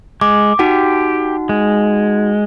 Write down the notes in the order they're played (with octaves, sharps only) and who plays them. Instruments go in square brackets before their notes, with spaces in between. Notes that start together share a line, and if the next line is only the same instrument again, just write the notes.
[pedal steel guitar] G#3 [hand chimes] D6
[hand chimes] D#4 F#4 F#5 [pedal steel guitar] G4
[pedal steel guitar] G#3